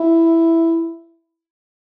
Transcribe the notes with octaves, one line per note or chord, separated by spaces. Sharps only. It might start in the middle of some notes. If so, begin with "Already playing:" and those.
Already playing: E4